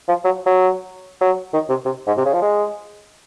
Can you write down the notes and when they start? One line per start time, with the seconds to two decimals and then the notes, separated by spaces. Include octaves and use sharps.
0.08 F3
0.25 F#3
0.46 F#3
1.21 F#3
1.54 D#3
1.69 C3
1.85 C3
2.07 G#2
2.17 C3
2.25 C#3
2.33 F3
2.42 G#3